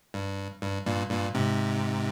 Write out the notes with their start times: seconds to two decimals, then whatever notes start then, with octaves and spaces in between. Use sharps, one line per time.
0.14 G2
0.62 G2
0.86 G2 A#2
1.10 G2 A#2
1.34 G#2 C3